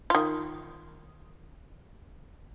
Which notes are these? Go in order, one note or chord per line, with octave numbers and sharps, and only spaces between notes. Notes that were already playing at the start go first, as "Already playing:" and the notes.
D#3 F4